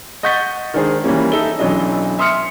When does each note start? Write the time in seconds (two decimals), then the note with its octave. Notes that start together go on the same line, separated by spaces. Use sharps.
0.23 D#5 F#5 C#6 G6 A6 B6
0.74 D#3 G#3 D4 G#4 C5
1.04 E3 G3 A#3 C#4
1.32 D#4 A4 E5 G7
1.59 B1 E3 F#3 C#4 D4 D#5
2.19 E5 C6 D#6 F6 C#7